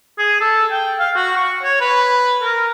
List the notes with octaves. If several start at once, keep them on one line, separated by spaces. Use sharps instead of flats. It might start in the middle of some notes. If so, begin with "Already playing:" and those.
G#4
A4
G5
F5
F#4
C#6
C#5
B4
A#4